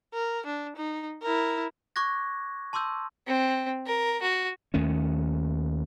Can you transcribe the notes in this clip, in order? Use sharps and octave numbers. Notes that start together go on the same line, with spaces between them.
A#4
D4
D#4
E4 A#4
C#6 D6 F#6 G#6 A#6
A5 C6 D6 E6 G6
C4
A#4
F#4
D#2 D#3 A3 C#4